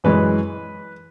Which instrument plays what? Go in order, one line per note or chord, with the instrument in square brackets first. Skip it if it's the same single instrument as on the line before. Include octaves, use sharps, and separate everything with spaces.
[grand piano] F#2 E3 G#3 B4